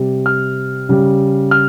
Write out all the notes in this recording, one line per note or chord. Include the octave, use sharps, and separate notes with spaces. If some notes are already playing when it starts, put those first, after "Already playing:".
Already playing: C3 G3
F6
C#3 G3
F6